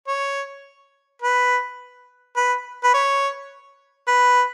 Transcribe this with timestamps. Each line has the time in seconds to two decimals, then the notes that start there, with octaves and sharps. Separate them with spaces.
0.08 C#5
1.22 B4
2.36 B4
2.84 B4
2.94 C#5
4.08 B4